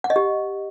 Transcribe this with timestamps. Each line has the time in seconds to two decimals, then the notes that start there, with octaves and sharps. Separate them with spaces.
0.04 F#5
0.10 D#5
0.16 G4